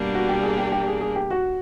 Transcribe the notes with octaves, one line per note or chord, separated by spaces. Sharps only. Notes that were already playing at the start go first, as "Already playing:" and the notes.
Already playing: B2 G3 A#3 D4
F#4
G4
G#4
G4
G4
G#4
G#4
G4
F#4